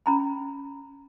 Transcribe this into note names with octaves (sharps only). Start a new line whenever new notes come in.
C#4 A#5 B5